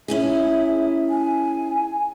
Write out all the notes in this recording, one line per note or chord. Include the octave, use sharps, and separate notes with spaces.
C#4 E4 G#4 E5
G#5